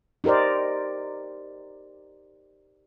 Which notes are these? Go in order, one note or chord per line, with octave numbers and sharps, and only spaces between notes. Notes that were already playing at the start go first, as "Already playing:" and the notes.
D#4 G4 A#4 C5 D5